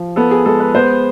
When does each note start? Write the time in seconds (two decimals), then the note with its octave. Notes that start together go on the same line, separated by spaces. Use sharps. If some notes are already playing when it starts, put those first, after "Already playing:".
Already playing: F3
0.16 B3 A4
0.31 G#4
0.46 G#3 A4
0.60 B4
0.75 B3 C5